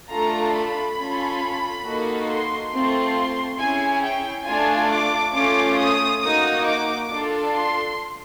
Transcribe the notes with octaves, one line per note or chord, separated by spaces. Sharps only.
A3 D4 F4 A4 A#5
B5
C#4 F4 A4
A#3 D#4 F#4 A4
C6
A3 C4 F4 C6
C#4 E4 G#4 G#5
G5
A3 D4 F4 G#5
D6
A3 C#4 F4 D6
D#6
A#3 D#4 F#4 D#6
D6
D4 F4 A4
C6